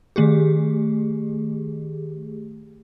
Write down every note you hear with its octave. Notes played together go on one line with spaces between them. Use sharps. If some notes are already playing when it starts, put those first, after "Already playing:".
D#3 A3 G4 G#4